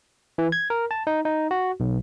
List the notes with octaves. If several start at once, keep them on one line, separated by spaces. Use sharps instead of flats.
E3
G#6
A#4
A5
D#4
D#4
F#4
B1